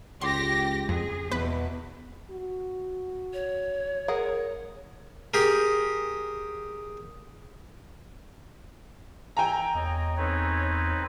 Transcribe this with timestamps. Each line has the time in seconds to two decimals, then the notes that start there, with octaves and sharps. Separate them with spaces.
0.21 C#2 G4 C6 A#6
0.89 F2 G#4
1.32 E2 B2 B3 B4
2.31 F#4
3.34 C#5
4.08 G#4 A#4 F#5
5.34 G4 G#4 A#4
9.37 D#3 E3 E4 G5 G#5 A#5
9.75 E2 A#3 C#5 D#5
10.17 C4 D#4 A4 B4 C#5